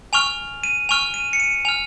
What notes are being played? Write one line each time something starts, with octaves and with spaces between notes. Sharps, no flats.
G#5 C#6 F6 F7
D#7
G#5 C#6 F6 F7
D#7
C#7
D#7
G#5 F6 F7